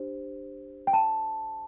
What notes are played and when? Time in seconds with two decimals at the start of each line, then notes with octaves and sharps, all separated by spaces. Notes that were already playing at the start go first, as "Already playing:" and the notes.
Already playing: D4 G4 C5
0.87 G5
0.93 A5